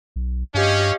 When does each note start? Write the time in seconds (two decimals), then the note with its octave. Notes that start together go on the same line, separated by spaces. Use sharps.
0.16 B1
0.54 G2 C#4 G4 D#5 F5